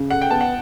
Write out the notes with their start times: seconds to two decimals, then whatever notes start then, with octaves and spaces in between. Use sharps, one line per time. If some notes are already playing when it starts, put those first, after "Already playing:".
Already playing: C#3
0.10 A4 F#5
0.22 G5
0.31 B3 A5
0.41 F#5